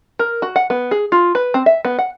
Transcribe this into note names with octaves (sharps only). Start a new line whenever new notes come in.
A#4
F#4
F#5
B3
G#4
F4
B4
C4
E5
B3
F#5